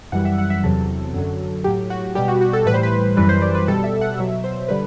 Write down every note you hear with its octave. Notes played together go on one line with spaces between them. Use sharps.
F#2 E3 G3 F#5
E5
F#5
E5
E2 C3 F#3 A4
F#2 D3 F#3
A2 F#3 G4
F#4
B2 G3 G4
F#4
F#4
A4
A2 E3 G3 B4
C5
B4
F#2 E3 G3 B4
C5
D5
B4
B2 G3 A4
E5
F#5
B2 F#3 E5
C5
D3 G3 B4